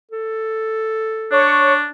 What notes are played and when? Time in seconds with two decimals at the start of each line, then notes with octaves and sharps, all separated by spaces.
0.11 A4
1.31 D4 C#5 C#6